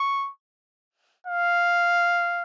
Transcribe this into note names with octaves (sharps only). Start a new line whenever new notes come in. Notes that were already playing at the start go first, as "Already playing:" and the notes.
Already playing: C#6
F5